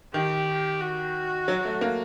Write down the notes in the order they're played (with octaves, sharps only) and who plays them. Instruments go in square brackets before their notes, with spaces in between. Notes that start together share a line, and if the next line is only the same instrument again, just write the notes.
[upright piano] D#3 [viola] G4
[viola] F#4
[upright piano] F#3
A3
A#3